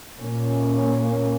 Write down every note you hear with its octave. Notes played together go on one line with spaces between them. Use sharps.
A#2 A#3 C#4